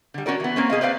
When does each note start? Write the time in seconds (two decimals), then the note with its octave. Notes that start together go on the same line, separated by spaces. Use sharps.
0.14 D3 G3
0.26 C#4 F#4 A#4 D5
0.40 E3 B3
0.56 A#3 C4 C#4
0.70 B2 G#4 D#5 F5
0.81 B4 C5 D5 E5 F5